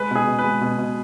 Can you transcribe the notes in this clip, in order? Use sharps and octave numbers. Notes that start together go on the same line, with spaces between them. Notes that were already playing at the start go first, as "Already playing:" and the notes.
Already playing: G#3 B4
B2 G#4
B2
B4
G#3
B2
B2